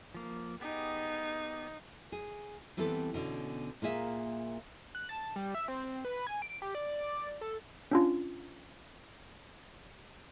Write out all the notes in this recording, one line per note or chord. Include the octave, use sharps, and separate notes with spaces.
F3 A#3
B3 D#4 G4 G#4
G#4
E3 G3 B3 C4 A4
B2 D3 C#4
A#2 A#3 G#4 E5
F#6
A5
G3
E5
C4
B4
G#5
D7
G4
D5
D5
A4
C#4 D4 F4